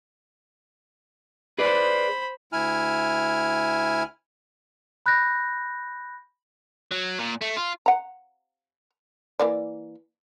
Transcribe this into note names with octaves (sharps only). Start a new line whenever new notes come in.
G#4 B4 C5 D5 B5
D2 E4 G#5 F6
B5 F#6 G6 A#6
F#3
A#2
A3
F4
F#5 A#5
E3 A#3 D5